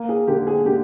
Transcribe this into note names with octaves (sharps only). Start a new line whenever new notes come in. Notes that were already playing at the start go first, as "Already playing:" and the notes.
Already playing: A#3
G#4
D3 G4
G#4
D3 G4